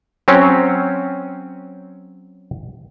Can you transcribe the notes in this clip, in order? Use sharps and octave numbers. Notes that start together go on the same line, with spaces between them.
F#3 C4 C#4